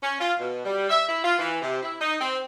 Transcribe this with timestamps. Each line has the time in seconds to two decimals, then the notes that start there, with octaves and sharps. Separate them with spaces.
0.02 C#4
0.20 F4
0.40 B2
0.65 G3
0.89 E5
1.08 E4
1.23 F4
1.39 E3
1.62 C3
1.82 E4
2.00 D#4
2.20 C4